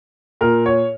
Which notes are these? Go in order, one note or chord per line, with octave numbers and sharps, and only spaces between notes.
A#2 A#4
C#5